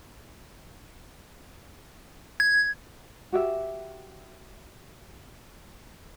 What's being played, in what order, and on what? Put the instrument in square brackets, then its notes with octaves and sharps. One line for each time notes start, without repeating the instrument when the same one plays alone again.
[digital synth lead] G#6
[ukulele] F#4 G4 E5